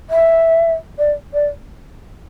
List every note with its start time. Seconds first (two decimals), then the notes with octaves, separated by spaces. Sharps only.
0.10 E5
0.98 D5
1.33 D5